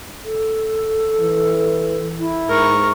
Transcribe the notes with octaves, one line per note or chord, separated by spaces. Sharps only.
A4
E3
E4
G#2 A#4 C#6